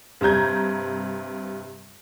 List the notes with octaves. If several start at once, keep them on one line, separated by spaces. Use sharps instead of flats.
G2 C3 A#5 G6 G#6